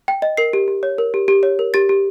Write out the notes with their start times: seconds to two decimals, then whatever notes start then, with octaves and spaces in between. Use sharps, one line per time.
0.08 G5
0.22 D#5
0.37 A#4 C7
0.53 G4
0.68 G4
0.83 C#5
0.98 A#4
1.14 G4
1.28 G4
1.43 C#5
1.59 A#4
1.74 G4 A6
1.89 G4